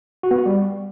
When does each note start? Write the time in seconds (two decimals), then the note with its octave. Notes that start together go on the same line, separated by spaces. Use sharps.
0.23 F#4
0.31 B3
0.38 F#4
0.46 G3